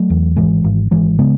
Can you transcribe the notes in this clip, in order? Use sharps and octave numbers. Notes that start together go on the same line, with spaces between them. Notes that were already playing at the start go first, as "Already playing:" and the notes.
Already playing: F#3 A3
E2
G#1 E3 G#3
G#1
G#1 E3 G#3
C#3 G#3 B3